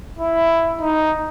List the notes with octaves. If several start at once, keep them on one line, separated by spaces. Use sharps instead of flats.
E4
D#4